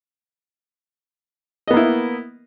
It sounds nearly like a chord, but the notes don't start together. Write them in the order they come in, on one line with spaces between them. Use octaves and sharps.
D#5 B3 A#3 E4